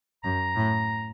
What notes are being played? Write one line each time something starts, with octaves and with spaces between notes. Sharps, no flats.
F#2 A#5
A2